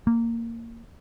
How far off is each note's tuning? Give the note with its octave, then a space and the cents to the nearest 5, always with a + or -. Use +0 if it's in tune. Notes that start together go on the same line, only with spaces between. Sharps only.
A#3 -15